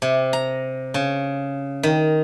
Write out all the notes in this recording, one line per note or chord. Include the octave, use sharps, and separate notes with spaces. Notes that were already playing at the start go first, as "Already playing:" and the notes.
C3
A#5
C#3
D#3